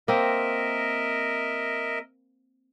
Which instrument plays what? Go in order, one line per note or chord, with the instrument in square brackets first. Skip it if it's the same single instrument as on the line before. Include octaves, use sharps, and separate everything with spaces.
[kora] A#3 C4 [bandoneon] A#4 D#5 E5